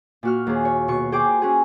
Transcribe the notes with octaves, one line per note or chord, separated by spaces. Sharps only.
A#2 F#4 F6
D#2 G#4
C#5
B2 C#6
G#4 C5 G5 D6
C#4 F#4 G#4